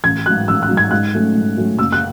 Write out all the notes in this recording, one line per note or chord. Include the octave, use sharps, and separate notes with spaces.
A1 G#6
G#2 F#3 F#6
A1 E6
F#6
G#2 F#3
G#6
G#2 F#6
F#3 A3 C#4
G#2
F#3 A3 C#4
F#1 E6
F#6